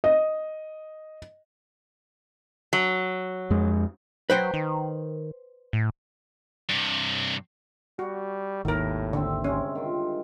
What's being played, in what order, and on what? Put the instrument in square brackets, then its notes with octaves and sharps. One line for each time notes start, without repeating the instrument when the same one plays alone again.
[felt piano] D#5
[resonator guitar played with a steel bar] F#3
[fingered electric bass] F2 G#3
[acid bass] F#3 [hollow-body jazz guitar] B4 C5 G5
[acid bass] D#3
A2
[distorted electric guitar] G2 C3
[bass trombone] G3 [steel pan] F#4 [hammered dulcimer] C#6
[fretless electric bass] G#1 D#2 [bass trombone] A2 [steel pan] D#3 A#4
[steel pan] D3 [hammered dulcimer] C4 E5 G5
[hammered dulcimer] G2 G#3 [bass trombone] C3 [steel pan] C#4
[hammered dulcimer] D#3 C4 F4